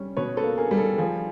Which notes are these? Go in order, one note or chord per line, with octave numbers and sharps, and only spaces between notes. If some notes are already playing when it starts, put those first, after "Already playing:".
Already playing: G3 C#4
B2 B4 C#5
A4 B4
A#3
G#4 A#4
G3
A4
F3 G#4